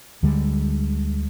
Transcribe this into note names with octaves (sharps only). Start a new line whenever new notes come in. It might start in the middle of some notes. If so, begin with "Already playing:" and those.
D2 D3 G3 G#3